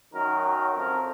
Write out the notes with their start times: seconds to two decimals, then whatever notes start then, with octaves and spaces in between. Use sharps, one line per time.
0.13 F#2 D#3 F#3 A#4
0.43 A#4
0.73 F2 F3 A#4